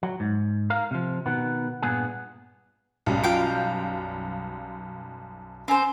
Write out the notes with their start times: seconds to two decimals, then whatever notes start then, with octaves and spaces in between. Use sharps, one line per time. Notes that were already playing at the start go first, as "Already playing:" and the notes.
0.03 F#3
0.20 G#2
0.70 A#4 F5
0.91 C3 F3
1.26 B2 D#3 B3
1.82 G2 A#2 B3 G#4
3.06 B1 F#2 G3
3.24 F4 F5 G5
5.68 C4 C#4 C5 G#5